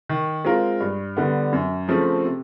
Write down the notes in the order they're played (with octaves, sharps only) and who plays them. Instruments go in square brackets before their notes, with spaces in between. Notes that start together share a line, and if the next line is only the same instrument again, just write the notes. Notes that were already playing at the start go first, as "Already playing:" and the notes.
[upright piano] D#3
G#3 C4 F4 A#4
G2
D3 G3 B3
F#2
C#3 F3 A3 C4
C3